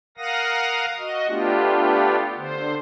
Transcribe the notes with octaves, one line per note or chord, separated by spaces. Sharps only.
A#4 F5 F#5 D#6 A#6
F#4 D#5
A3 B3 D4 F4 G4
D3 C5